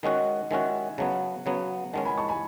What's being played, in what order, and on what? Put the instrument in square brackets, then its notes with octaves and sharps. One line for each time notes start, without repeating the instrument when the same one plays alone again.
[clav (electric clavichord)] D#3 G#3 C#4 F#4 [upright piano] D#5 F#5
[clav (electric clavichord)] D#3 G#3 C#4 F#4 [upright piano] E5 G#5
[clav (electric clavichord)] C#3 F#3 B3 [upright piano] F#5 A5
[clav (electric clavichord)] C#3 F#3 B3
[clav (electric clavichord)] D#3 G#3 C#4 [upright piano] F#5 A5
[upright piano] G#5 B5
A5 C#6
G#5 B5